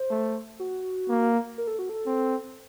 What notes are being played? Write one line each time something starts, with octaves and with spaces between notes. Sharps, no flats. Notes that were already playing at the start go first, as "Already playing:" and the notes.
Already playing: C5
A3
F#4
A#3
A#4
A4
F#4
A4
C4